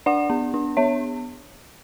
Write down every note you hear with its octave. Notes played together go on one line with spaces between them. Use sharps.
D4 D5 F#5
B3
D4
B3 C#5 E5